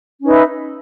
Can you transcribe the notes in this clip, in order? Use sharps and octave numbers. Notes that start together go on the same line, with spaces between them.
C#4 D#4 B4 E5